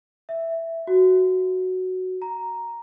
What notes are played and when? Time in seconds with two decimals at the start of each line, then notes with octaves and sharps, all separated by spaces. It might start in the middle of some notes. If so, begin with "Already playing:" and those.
0.29 E5
0.87 F#4
2.22 A#5